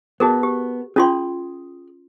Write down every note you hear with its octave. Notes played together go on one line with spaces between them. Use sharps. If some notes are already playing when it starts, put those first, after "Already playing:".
B3 F#4 G#4 A#4 A5
G4
C#4 F4 G#4 G5 C6